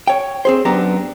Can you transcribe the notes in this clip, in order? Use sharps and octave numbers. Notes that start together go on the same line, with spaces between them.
C#5 G5
C4 G#4 C5
F#2 B3 D4 G4 A#5